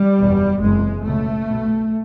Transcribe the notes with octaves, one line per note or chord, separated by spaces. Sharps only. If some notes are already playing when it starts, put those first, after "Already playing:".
Already playing: G3
F#1 E2 B2
F#1 E2 C3 G#3
C#2 B2 A3
B1 B2